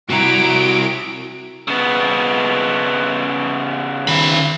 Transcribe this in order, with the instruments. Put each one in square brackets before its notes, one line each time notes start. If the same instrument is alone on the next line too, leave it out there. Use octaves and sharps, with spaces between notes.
[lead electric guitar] C3 E4 [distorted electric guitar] F#4 A#5 [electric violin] D7
[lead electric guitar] C#3 B3
[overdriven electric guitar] D#3 B5